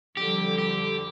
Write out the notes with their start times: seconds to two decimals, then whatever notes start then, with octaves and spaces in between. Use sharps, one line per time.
0.17 F2 D3 G3 G4
0.58 G4